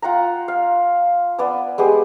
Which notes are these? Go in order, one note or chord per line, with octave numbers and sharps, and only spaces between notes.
F4 F#5 G5 A#5
F5
B3 D5 G#5 E6
G#3 B3 G4